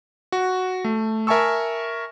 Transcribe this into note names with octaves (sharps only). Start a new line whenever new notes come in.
F#4
A3
A#4 E5 G#5 A5 C#6 E6